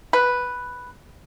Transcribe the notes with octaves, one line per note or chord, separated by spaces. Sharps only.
B4